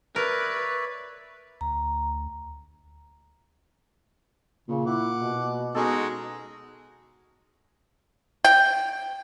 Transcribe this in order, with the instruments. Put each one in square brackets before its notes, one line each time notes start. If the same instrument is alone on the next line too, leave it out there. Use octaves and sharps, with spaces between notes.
[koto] A#4 [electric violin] B4 [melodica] C#5 D5 E5
[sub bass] D2 [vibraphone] A#5
[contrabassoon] A#2 [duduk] C#3
[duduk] E4 [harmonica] F#5 D6
[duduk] B2
[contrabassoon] B2 [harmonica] G#3 F#4 [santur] C#4 D#4 A4
[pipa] G5